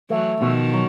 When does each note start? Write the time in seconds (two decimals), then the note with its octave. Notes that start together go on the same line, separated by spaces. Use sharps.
0.10 E3 F#3 A3
0.42 B2 D#3 F3
0.74 F#3